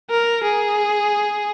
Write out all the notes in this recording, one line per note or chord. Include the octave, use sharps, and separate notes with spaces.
A#4
G#4